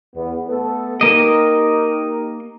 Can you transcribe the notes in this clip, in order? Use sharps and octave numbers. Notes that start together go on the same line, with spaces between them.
E2 B3
A3 B3 A4
A#3 D#4 G4 A#4 D#5